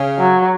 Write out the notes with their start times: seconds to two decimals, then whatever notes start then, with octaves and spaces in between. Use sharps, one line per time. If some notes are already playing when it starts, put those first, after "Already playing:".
Already playing: C#3
0.19 F#3